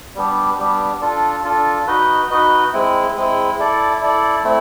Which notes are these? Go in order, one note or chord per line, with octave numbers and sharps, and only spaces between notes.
G3 B3 D4 G4
G3 B3 D4 G4
D4 F4 A4
D4 F4 A4
D#4 F#4 B4 D#5
D#4 F#4 B4 D#5
G#3 C4 E4
G#3 C4 E4
E4 A4 D5
E4 A4 D5
A3 C4 E4